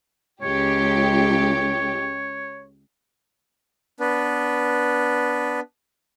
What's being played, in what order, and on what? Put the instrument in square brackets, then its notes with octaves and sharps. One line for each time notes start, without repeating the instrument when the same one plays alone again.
[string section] C#2 G4 [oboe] C#5
[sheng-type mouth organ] B3 D4 B4